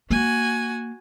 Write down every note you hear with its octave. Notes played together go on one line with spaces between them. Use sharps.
A#3 F#4 G#5